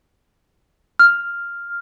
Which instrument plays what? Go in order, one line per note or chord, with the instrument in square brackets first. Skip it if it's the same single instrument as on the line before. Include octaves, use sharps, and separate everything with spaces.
[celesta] F6